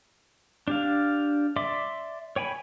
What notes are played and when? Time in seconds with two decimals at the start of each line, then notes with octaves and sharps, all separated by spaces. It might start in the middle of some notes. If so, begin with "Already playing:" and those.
0.68 D4 G4 F5
1.56 D5 E5 C6 D6
2.36 C#5 G5 G#5 B5